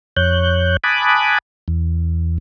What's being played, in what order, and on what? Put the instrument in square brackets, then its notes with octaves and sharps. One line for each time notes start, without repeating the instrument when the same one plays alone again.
[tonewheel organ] F2 C#5 F#6 G6
G#5 A5 B5 D6 D#6 F#6
E2